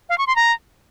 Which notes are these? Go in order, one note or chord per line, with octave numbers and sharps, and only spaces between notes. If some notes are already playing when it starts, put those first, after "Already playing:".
F5
C#6
C6
A#5